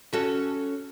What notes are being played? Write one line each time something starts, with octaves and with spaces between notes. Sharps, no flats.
C#4 F#4 A4